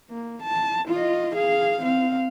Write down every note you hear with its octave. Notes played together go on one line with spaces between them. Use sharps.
A#3
A5
F4 D#5
G#4 F5
C4 F5